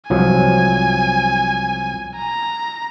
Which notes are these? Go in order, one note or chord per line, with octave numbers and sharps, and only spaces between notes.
C2 F3 F#3 G#5
A#5